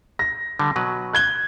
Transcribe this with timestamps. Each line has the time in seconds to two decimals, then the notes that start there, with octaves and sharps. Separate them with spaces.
0.19 A#6
0.59 D3 G3
0.76 B2 F#3 B4
1.13 F#6 G#6 G7